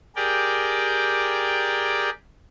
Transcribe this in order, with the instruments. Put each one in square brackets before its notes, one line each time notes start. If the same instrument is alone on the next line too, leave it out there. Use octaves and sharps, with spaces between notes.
[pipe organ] G4 G#4 A#4 D5 G5